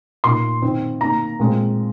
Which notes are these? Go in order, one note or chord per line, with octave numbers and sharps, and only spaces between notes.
A#2 A#3 D#4 C6
D#3 C4 D#4
D#3 A#3 D#4 A#5
A#2 G#3 C4